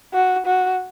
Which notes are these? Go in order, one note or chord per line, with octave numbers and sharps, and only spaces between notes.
F#4
F#4